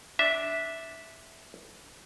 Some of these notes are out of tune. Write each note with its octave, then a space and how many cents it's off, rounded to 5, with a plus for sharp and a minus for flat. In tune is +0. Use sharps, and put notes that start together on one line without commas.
D4 +0 E5 -5